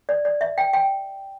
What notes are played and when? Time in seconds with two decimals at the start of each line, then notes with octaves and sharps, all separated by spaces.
0.09 D5
0.25 D5
0.41 E5
0.58 G5
0.73 G5